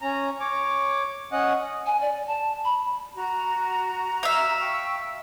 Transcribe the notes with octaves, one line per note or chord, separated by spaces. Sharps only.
C#4 A#5
C#5 D6
C#4 D#5 F#5
G#5
D5
A5
B5
F#4 A#5
E5 F5
G5 C#6 E6